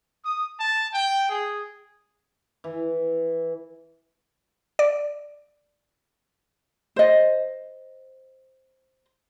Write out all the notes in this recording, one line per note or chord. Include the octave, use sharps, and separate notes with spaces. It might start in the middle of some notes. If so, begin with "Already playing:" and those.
D#6
A5
G5
G#4
E3
D5
C5 D#5